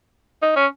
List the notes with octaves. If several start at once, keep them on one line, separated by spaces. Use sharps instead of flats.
D#4
C#4